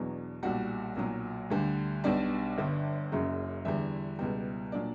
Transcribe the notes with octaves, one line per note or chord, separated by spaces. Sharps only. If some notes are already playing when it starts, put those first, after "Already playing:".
Already playing: E2 B2 F#3 D4
B1 A#2 G3 F#4 F#5
B1 A#2 F#3
D2 D3 G3
B1 B2 G3 D4 D5
G1 G2 D3
F#1 F#2 C#3 F#3
E2 D3 G3 E4 E5
C#2 B2 G3
A#2 F#3 D4 D5